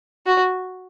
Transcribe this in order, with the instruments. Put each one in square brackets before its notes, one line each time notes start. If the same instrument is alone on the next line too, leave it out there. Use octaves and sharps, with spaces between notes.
[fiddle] F#4